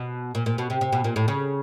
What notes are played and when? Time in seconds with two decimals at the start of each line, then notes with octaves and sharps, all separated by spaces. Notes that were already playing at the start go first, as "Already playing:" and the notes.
Already playing: B2
0.35 A#2
0.46 A#2
0.58 B2
0.70 C3
0.81 C3
0.93 B2
1.04 A#2
1.16 A2
1.28 C#3